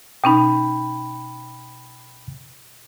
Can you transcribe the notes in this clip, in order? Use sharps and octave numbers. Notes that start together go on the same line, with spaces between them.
B2 C#4 D#4 G5 B5